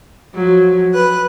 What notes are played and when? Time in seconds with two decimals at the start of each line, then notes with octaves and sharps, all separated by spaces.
0.35 F3 F#3
0.93 B4 F#6